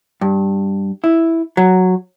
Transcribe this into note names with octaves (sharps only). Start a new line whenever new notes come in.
G2
E4
F#3